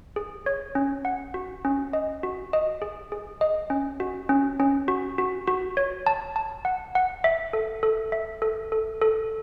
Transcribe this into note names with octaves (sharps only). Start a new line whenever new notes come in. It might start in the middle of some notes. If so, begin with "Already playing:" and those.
G#4
C#5
C#4
F#5
F#4
C#4
D#5
F#4
D#5
G#4
G#4
D#5
C#4
F#4
C#4
C#4
F#4
F#4
F#4
C#5
A5
A5
F#5
F#5
E5
A4
A4
E5
A4
A4
A4